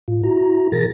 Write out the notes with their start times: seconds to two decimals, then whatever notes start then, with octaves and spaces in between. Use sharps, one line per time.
0.08 A2 F4
0.23 E4 F#4 A#5
0.72 B2 E3 G#4 A#4 A6 A#6